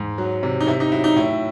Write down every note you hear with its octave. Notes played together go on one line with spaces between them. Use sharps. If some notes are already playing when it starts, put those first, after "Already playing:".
Already playing: G#2
F#3
C3
D#4
C3 E4
D#4
F#3 E4
D#4
A2 E4